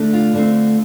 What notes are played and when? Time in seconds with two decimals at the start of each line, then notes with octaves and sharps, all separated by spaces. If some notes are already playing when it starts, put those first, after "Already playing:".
Already playing: D3 A3 D4
0.13 F4
0.33 D3 A3 C4